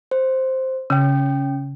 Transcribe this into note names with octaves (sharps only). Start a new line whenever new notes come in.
C5
C#3 C#4 G5